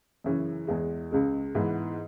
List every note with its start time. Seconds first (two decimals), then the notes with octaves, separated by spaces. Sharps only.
0.24 F#2 C#3 E3 C#4
0.67 E2 E3 G#3
1.11 C#2 C#3 G#3
1.55 G#2 E3 B3